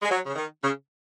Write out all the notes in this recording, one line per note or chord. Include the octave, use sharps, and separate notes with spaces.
G#3
F#3
C#3
D#3
C#3